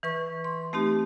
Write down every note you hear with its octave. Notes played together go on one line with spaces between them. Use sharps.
E3 B4 C#6
C6
A3 C4 D#4 G4